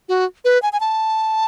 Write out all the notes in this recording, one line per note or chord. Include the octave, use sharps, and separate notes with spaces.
F#4
B4
G#5
G#5
A5